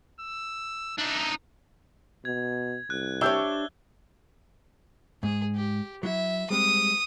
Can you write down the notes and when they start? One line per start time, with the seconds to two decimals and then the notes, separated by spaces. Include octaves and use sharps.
0.21 E6
0.98 D4 D#4 E5
2.25 B2 G#6
2.90 C2 F#6
3.21 D4 G4 C#5 E5 E6 G6 G7
5.23 G#2 G#4
5.56 G4
6.03 F#3 E4 E5
6.50 G3 G#3 C4 D#6